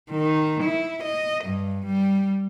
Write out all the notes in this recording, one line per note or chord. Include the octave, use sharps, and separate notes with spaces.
D#3
E4
D#5
G2
G3